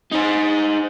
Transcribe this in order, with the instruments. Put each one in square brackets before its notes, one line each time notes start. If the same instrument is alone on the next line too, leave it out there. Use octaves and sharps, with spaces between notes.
[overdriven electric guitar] D#4 C5